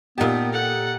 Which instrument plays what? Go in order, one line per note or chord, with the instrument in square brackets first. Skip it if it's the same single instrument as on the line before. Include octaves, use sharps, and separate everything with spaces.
[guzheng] A#2 A5 [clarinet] B3 [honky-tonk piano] D#4 G4
[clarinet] A4 [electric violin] F#5